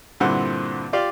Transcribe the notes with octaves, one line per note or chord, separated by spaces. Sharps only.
G2 A#2 D3 C4 E4 F#5
F4 G4 D5 F5